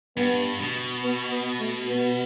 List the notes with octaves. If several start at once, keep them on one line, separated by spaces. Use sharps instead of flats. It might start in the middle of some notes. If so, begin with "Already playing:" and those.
G2 B3
B2
B3
B3
A3
B3